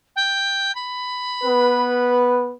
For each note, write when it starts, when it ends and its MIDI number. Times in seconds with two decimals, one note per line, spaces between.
0.16 0.74 79
0.75 2.18 83
1.44 2.53 59
1.44 2.53 71